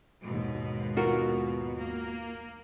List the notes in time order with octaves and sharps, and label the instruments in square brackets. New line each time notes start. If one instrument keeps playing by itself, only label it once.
[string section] D#2 G#2 B2
[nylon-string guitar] F4 F#4 A#4
[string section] A#3